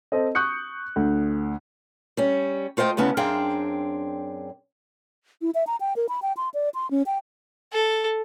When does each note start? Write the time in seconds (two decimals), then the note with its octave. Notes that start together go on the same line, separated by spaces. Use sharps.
0.12 C4 A4 D#5
0.35 C#6 D#6 F#6 G6 C#7
0.96 D2
2.17 G3 C#4
2.77 A3 F4 C5 D#5 G5
2.97 D2 C#3 B3 C#4 E4 A5
3.17 F#2 C4 D4 G#4 F5 G5
5.42 E4
5.55 E5
5.67 A#5
5.80 G5
5.96 A#4
6.09 B5
6.22 G5
6.37 C6
6.54 D5
6.74 C6
6.91 C#4
7.06 G5
7.73 A4